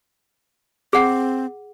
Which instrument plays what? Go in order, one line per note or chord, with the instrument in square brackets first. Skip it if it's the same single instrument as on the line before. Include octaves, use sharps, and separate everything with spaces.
[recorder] C4 [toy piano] G#4 F#5